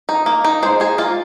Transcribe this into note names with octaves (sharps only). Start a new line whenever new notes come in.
D#4
A#3
D#4
G#3 C5
D#4 G#4
A#3 F4